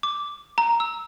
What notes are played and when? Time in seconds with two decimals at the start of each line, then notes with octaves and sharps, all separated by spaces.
0.03 D6
0.58 A#5
0.80 E6